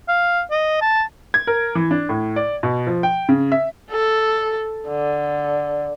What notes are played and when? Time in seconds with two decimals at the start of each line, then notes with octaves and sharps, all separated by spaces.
0.09 F5
0.51 D#5
0.82 A5
1.34 G#6
1.47 A#4
1.75 E3
1.91 D4
2.09 A2
2.36 D5
2.63 B2
2.87 F3
3.03 G5
3.29 C#3
3.52 E5
3.91 A4
4.88 D3